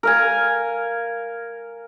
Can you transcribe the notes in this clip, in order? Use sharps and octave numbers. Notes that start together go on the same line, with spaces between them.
A#4 F5 G#5